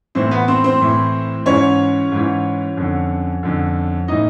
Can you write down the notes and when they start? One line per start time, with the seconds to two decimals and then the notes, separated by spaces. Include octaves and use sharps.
0.15 A2 E3 C4 C5
0.31 B3 B4
0.48 C4 C5
0.64 C4 C5
0.81 A2 E3
1.46 G#2 E3 C#4 C#5
2.12 G#2 E3
2.77 F2 D3
3.43 F2 D3
4.08 A2 E3 D#4 D#5